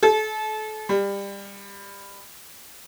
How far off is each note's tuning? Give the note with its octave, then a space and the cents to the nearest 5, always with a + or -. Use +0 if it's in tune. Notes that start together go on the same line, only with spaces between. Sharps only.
A4 -35
G3 +25